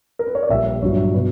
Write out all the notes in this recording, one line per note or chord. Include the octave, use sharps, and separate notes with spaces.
A#4
B4
C#5
D5
A#1 A#2 G3 E5
G1 G2 F#3 C#5
B2 B4